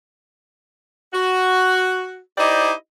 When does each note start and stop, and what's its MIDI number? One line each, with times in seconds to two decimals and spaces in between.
1.14 2.19 66
2.38 2.72 63
2.38 2.72 64
2.38 2.72 67
2.38 2.72 72
2.38 2.72 74
2.38 2.72 75